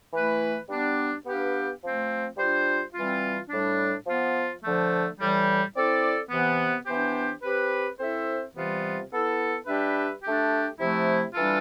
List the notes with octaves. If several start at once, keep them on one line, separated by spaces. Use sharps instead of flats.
E3 A3 E4 B4
G3 B3 D4
B3 D4 G4 B4 F5
F3 A3 C4
G3 D4 F4 C5
E3 G3 C4 F4
A2 G3 D4
F3 B3 F4
D3 F3 A3
A2 E3 G3
C4 E4 A4 D5
C3 E3 B3
E3 B3 D4 G4 C5
C4 G4 B4
C4 E4 A4 C5 E5
C3 E3 G3 B3 F4
B3 E4 A4
G3 D4 G4 B4 E5
A3 D4 G4
C3 F3 A3 E4
E3 G3 D4 F4 A4